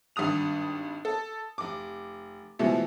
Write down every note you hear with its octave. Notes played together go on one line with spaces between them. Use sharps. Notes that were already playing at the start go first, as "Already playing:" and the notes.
G#1 G2 G4 D#6 F7
A4
F1 D6
B2 E3 F3 G#3 A3